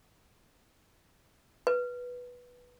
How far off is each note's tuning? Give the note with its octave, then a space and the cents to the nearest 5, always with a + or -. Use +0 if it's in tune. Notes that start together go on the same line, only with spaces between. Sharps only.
B4 -10